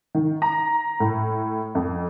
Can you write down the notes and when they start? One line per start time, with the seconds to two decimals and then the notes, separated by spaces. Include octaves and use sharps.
0.15 D#3
0.42 A#5
1.00 A2
1.75 F2